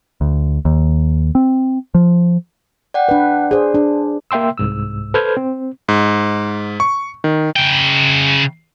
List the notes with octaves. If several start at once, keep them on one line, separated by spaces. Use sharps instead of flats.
D2
D#2
C4
F3
D5 F#5 G5
D4 B4
G#4 C5 D5
D4
A#3 E5 G5 C6 E6
C2 G#2 E6
A4 B4 C5 F6 G6 G#6
C4
G#2
C#6
D#3
C#3 G5